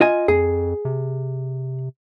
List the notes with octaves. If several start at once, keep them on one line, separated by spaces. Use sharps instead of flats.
F4 D#5 G#5
F2 G#4
C3